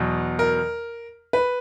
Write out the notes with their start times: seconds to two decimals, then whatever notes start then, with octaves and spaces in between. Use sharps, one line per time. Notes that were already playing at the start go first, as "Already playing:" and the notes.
Already playing: E2 B2 F#3
0.39 A#4
1.33 B4